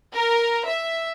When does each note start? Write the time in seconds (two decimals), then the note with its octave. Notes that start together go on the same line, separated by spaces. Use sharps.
0.14 A#4
0.66 E5